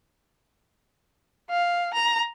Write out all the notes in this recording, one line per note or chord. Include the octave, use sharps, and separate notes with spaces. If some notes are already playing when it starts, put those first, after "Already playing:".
F5
A#5